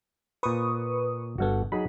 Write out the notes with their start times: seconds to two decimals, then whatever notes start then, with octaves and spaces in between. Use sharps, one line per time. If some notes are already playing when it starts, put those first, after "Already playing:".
0.43 A#2 B4 C5 C#6 D#6
1.38 G1 G2 B3 F#4 A4
1.72 F#3 D#4 G#4 B5